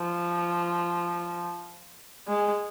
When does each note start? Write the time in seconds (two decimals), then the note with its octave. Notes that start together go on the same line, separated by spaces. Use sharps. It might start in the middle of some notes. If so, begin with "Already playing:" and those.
Already playing: F3
2.28 G#3